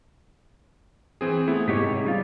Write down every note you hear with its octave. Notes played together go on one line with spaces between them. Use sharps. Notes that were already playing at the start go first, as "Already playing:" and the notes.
E3 C4 G#4
A3 B3 E4
G#2 C3 G4 G#4 C#5 B6
C#3 G3 F4